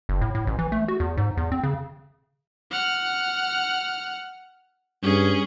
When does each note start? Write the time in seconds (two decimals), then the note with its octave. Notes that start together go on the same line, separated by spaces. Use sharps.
0.09 F#1
0.21 A2
0.35 A2
0.47 A1
0.59 E3
0.72 A3
0.88 F#4
1.00 E2
1.17 G#2
1.37 E2
1.52 C4
1.63 C#3
2.71 F#5 F6
5.03 G2 C#4 G#4